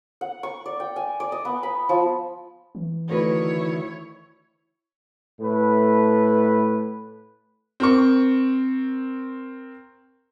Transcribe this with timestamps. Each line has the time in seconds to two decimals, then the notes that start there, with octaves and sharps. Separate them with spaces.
0.21 F#5
0.43 C#6
0.66 D5
0.80 G5
0.96 G#5
1.20 D5
1.32 D#5
1.45 B3
1.63 B5
1.89 F3
2.75 E3
3.09 D2 D#3 E4 B4 C#5
5.41 A2 A3 B4
7.80 C4 A#4 C#6